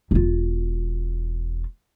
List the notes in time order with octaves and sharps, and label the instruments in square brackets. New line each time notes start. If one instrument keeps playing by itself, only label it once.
[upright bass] E1 F4